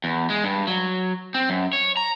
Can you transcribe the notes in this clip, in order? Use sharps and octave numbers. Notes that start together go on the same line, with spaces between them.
E2
G#3
G2
F#3
C4
F#2
C#5
A#5